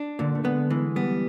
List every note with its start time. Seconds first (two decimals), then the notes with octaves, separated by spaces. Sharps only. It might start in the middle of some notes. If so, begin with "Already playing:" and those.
Already playing: D4
0.19 A#2 D3
0.35 A3
0.45 G#3 B3
0.70 E3 G#3
0.96 G3 B3